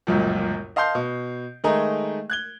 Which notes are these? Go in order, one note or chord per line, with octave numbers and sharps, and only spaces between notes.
G1 C#2 F#2 A#2
D#5 F5 A5 C6 G6 C7
B2
D#3 G#3 A3 G#4 D#5 A#5
F#6 G#6 G7